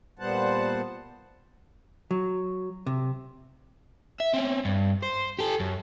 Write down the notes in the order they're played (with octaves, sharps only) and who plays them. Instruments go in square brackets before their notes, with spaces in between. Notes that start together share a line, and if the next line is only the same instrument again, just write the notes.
[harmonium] A#2 G3 B3 C5 F#5 A5
[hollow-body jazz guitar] F#3
C3
[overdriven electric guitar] E5
C4 C#4
G2
C5
G4 A4
F#2